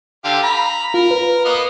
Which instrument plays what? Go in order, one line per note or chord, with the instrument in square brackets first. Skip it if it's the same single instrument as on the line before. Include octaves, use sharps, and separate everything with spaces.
[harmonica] D3 G4 F5
A#5 B5
[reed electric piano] F4 [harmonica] A#4
[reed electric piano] B4
[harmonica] A#3 B3 D#5